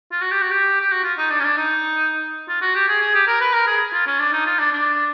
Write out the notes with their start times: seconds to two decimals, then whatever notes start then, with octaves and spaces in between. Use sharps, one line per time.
0.12 F4
0.22 F#4
0.31 G4
0.42 F#4
0.51 G4
0.81 G4
0.91 F#4
1.04 F4
1.18 D#4
1.30 D4
1.40 C#4
1.44 D4
1.57 D#4
2.49 F4
2.62 F#4
2.75 G4
2.89 G#4
3.01 G#4
3.15 G4
3.27 A#4
3.41 B4
3.53 A#4
3.67 G#4
3.94 F4
4.07 C#4
4.19 D4
4.33 D#4
4.46 F4
4.59 D4
4.73 D4